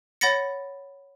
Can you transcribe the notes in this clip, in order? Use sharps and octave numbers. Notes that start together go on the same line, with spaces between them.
C#5 F#5 B5 A6 A#6 C#7